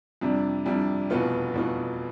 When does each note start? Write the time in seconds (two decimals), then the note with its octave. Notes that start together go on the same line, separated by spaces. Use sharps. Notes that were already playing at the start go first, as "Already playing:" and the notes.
0.21 F2 C3 G3 D4
0.66 F2 C3 G3 D4
1.10 F1 E2 B2 B3 F4
1.54 F1 E2 B2 B3 F4